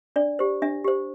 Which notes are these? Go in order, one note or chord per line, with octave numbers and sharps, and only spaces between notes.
D4 D5
G4 C5
D4 E5
G4 C5